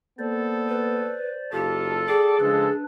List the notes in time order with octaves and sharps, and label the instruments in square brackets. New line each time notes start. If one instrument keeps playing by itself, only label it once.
[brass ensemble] A#3 B3 A4 [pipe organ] C5 D5
[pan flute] B4
[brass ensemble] F#1 D#4 F4 [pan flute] G4 [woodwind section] A4
[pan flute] G#4 [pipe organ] D5 G5 D6
[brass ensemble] C#3 F3 G#3 [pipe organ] D4 B4 [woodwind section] A4